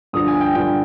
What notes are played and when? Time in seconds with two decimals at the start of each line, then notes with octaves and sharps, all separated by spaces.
0.13 G2 D3 F3 D#6
0.28 G#5
0.41 G5
0.55 G2 D3 F3 G5